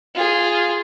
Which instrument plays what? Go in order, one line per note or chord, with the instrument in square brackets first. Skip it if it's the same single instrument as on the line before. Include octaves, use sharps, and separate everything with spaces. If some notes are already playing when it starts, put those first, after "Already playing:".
[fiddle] F4 G#4